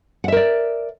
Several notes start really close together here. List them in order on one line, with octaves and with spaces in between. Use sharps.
F#5 E5 A#4 D5